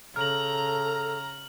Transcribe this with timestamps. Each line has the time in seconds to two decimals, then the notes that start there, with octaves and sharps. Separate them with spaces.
0.16 C#3 A4 A#5 F6 F#7